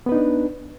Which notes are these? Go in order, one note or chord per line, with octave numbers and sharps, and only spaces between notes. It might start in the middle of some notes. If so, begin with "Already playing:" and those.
B3 D4 D#4 B4